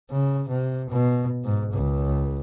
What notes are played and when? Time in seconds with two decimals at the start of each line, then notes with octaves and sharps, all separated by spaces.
0.11 C#3
0.49 C3
0.90 B2
1.44 G#2
1.73 C#2